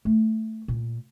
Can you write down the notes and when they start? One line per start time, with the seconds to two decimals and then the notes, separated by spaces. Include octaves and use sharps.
0.05 A3
0.68 A#2